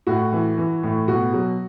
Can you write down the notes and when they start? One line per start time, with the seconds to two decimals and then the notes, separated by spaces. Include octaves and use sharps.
0.07 A2 F#4
0.32 E3
0.58 E3
0.83 A2
1.08 B2 F#4
1.33 F#3